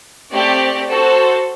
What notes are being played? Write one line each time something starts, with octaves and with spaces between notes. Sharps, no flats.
A3 C4 G4 D5
F#4 A4 C5